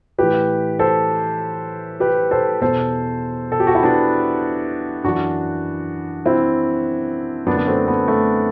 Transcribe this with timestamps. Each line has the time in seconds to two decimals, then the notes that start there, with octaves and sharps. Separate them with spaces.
0.18 A2 E3 G4 B4
0.79 A4 C5
2.00 G4 B4
2.31 A4 C5
2.61 E2 B2 A4 C5
3.52 A4
3.60 G4
3.67 F#4
3.75 E4
3.83 B3 D4
5.04 F#2 E3 D4 F#4
6.25 C4 E4
7.47 F#2 D3 B3 D4
7.57 B3
7.67 A3 C4
7.88 B3
8.08 A3